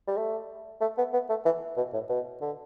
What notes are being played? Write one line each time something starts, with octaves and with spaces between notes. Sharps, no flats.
G3
A3
A3
B3
B3
A3
E3
B2
A2
B2
D3